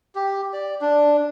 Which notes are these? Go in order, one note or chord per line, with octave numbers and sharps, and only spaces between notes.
G4
D5
D4